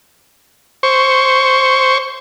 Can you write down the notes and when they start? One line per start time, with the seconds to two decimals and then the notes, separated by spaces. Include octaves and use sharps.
0.83 C5 C#6